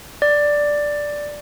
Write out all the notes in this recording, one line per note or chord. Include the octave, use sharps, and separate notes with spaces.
D5